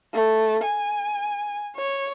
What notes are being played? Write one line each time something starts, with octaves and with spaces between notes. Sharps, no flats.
A3
G#5
C#5